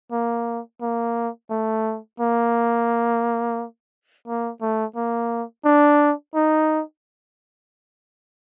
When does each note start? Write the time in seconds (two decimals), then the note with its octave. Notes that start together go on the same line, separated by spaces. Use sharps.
0.12 A#3
0.81 A#3
1.51 A3
2.20 A#3
4.27 A#3
4.61 A3
4.96 A#3
5.65 D4
6.34 D#4